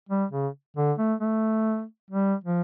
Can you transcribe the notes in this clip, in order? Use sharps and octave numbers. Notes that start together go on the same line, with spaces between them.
G3
C#3
D3
A3
A3
G3
F3